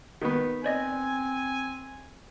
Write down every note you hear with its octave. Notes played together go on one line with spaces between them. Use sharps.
D#3 B3 F#4
C4 C5 D5 D#5 G#5